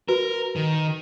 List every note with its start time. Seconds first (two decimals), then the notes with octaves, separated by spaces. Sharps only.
0.08 F#4 A#4 B4
0.56 D#3